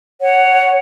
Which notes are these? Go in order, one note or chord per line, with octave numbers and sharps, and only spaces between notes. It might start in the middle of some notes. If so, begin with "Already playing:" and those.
C#5 F#5